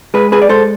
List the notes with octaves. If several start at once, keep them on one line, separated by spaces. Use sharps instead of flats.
G#3 G#4 B4
G#4 B4
D5
G#3 A4 C5